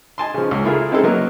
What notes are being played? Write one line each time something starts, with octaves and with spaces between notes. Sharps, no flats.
D#5 G#5 A5 C6
C#3 F3
C#2
A3 E4 F4 G#4 A#4
G#3 C4 D#4 E4 G#4 A4
F#3 A#3 B3 A#4 D#5